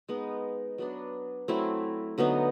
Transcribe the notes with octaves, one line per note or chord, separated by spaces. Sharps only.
G#3 B3 D#4
F#3 B3 D4
F#3 A3 C4 E4
D3 F#3 B3 D#4